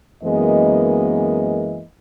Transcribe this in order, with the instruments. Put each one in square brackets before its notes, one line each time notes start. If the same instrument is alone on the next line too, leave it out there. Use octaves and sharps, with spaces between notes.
[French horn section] F#2 E3 G#3 A#3 B3 D#5